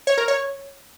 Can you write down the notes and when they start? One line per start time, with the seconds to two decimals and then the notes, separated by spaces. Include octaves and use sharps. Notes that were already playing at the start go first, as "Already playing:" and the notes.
0.07 C#5
0.18 A#4
0.28 C#5